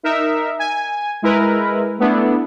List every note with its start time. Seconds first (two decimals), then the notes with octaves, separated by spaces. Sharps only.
0.03 D#4 A#4 E5
0.59 G#5
1.22 G#3 E4 A#4 B4
1.99 A3 B3 D4 E4